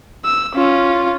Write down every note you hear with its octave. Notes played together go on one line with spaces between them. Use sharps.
E6
C#4 F4